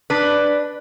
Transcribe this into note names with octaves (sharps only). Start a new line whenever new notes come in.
D4 B4